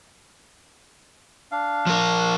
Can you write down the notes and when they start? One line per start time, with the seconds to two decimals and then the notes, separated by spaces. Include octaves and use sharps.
1.52 D4 F5
1.86 F3 A#4